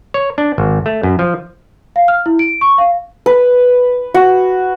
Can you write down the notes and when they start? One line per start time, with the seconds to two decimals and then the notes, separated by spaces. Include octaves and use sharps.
0.14 C#5
0.38 D4
0.58 G#1
0.86 A3
1.03 F#2
1.19 F3
1.96 F5
2.08 F6
2.26 E4
2.39 D7
2.61 C#6
2.78 F5
3.26 B4
4.14 F#4